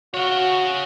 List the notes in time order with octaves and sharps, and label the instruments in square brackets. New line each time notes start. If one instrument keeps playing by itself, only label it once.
[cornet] F#4 [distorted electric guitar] C#5 F5